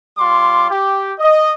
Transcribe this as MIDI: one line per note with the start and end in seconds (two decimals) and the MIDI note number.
0.18 0.66 55
0.18 0.66 65
0.18 0.66 84
0.18 0.66 86
0.69 1.13 67
1.19 1.51 75